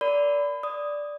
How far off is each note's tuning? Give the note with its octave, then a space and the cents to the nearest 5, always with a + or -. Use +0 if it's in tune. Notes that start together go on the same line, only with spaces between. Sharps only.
A#4 +10 D5 -20 B5 +25
D5 +0 D#6 +0